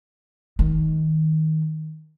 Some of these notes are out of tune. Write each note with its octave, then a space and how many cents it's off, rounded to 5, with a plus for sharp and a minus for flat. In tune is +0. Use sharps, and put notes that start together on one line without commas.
D#3 +20